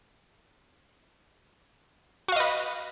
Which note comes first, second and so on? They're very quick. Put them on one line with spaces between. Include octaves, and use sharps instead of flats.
F#4 F5 D#5 B4